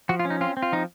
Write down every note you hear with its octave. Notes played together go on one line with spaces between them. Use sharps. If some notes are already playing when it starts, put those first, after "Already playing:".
F3 F#4
F4
C#4
D#4
C4 F4
C4
F4
F3 D#4